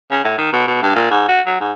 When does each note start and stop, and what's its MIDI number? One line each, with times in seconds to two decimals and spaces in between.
0.11 0.23 49
0.24 0.34 45
0.38 0.52 51
0.53 0.64 47
0.67 0.82 47
0.82 0.93 43
0.95 1.10 46
1.11 1.23 44
1.28 1.41 66
1.46 1.57 54
1.60 1.72 44